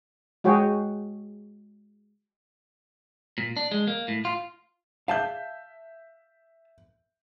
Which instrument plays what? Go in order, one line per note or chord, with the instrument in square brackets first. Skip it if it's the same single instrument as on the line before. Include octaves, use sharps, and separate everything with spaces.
[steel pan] G#3 F#4 G#4 C#5 G5
[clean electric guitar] A#2
D4
G#3
A#3
A2
F4
[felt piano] E5 G6 [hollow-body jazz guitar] F5 A5